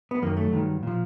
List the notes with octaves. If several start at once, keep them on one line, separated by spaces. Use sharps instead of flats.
B3
F#2 D#3 F#3 A#3
A3
G2 D#3 F#3
A#2 F3